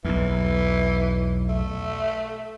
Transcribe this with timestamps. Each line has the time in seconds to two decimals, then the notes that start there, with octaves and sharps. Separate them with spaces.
0.05 B1 E2 E3
1.49 A3